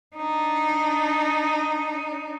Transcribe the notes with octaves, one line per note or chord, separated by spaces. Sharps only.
D4 D#4